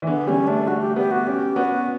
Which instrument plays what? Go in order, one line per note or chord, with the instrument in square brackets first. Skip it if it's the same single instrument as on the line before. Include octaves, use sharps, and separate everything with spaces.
[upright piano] E3
[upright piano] D3 [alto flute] B3
[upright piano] G3 [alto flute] C#4
[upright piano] A3 [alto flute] D4
[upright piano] A3 [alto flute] F#4
[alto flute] G4
[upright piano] B3 [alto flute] G4
[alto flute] F#4
[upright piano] C#4 [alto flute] G4
[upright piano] B3 [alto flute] F#4